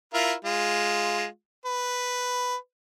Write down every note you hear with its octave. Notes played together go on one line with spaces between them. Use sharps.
E4 F4 A#4
G#3 F4
B4